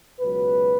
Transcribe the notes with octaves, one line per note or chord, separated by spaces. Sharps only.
C#2 B2 F#3 B4